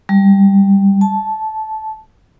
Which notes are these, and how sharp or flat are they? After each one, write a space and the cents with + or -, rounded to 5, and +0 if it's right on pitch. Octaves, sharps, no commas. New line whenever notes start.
G3 +10
A5 -15